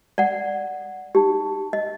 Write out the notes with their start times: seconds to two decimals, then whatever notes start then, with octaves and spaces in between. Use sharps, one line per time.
0.18 D5 F#5
1.15 D#4 G4
1.73 D#5